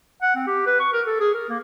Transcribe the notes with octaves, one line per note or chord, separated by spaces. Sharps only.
F#5
C4
G4
B4
C#6
A#4
A4
G#4
A#4
A#3